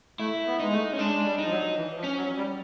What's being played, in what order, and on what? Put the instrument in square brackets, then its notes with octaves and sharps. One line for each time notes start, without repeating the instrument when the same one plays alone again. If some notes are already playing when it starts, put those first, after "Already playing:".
[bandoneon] A3 [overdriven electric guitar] E4
[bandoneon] B3
[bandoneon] G#3 [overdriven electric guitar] D#4
[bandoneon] A3
[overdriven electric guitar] C#4
[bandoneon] G#3 [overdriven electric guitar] D4
[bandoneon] G#3
G3
[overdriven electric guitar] D#4
[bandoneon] F3
F#3
E3
F3
[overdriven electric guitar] C#4
[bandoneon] F#3
G3